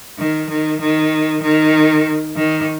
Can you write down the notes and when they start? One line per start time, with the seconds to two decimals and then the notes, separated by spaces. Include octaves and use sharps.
0.18 D#3
0.49 D#3
0.81 D#3
1.42 D#3
2.36 D#3